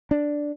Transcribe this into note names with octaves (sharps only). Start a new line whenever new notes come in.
D4